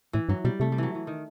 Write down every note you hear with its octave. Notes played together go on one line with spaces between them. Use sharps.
A2 E3
G2 F#3
B2 G3
C3 A3
G3
E3 F#3
E3
D#3